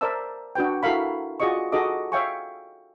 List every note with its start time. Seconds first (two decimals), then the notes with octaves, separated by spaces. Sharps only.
0.01 A#4 C5 D5 E5 A5 E6
0.55 D4 F#4 B4 G5
0.83 E4 F#4 A4 A#4 F5 B5
1.40 F4 F#4 G#4 D5 D#5 C#6
1.72 D#4 F#4 G#4 A4 D#5 D6
2.12 C#5 E5 F5 G5 G#5 C#6